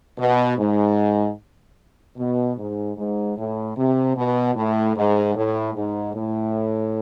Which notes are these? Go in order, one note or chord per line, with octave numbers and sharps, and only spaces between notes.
B2
G#2
B2
G#2
G#2
A2
C3
B2
A2
G#2
A2
G#2
A2